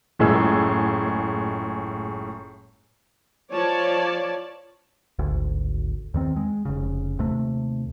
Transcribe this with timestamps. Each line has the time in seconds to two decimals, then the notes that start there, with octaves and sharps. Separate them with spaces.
0.19 F#1 A2 G#3 F4 G#4 E6
3.52 F3 C#5 D5 A5
5.19 G#1 D2
6.14 E2 D#3 C4
6.36 G#3
6.65 F1 C#3
7.19 D#2 C3 A3